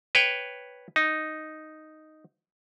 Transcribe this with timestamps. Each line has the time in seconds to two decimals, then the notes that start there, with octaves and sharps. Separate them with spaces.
0.15 B4 C#5 G5
0.96 D#4